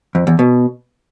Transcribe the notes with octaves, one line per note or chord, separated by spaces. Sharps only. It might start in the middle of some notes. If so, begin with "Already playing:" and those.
F2
E2
B2